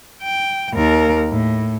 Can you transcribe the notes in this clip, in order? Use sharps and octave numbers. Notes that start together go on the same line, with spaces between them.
G5
D#2 A#4
A2